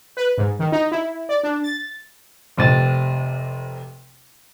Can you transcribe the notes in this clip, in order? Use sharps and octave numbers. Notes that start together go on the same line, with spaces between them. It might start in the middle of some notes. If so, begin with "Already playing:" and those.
B4
G#2
D#3
D#4
E4
D5
D4
A6
F1 C3 A6